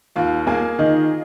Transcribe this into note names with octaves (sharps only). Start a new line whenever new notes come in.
D#2 F4 F5
A#3 G#4 G#5
D#3 D#4 D#5